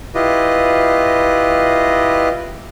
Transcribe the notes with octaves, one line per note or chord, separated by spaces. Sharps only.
E4 F4 G4 B4 D#5